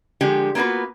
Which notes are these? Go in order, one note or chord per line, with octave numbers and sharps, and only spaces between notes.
D3 F3 G#3 G4
A#3 B3 F4 F#4 B4